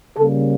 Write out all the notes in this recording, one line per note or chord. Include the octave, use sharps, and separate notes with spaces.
C#3 G3 A#3 A4